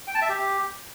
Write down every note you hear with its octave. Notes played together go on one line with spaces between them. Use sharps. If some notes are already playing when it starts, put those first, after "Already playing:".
G5
A5
E5
G4